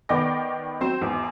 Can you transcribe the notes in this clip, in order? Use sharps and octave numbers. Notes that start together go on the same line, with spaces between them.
D#3 B3 D5 G5 D6 A#6
F#3 C4 C5
G#1 E2